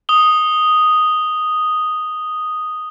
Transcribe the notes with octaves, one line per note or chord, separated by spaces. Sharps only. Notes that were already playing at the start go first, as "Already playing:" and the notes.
D#6 G7